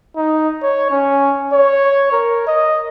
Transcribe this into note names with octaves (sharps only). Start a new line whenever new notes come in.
D#4
C#5
C#4
C#5
A#4
D#5